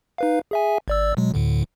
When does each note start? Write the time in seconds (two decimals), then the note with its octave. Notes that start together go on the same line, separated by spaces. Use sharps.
0.18 D#4 B4 F5
0.51 G#4 E5 G#5
0.88 G#1 D5 E6
1.17 B2 F#3 G#3
1.34 D2 A2 D3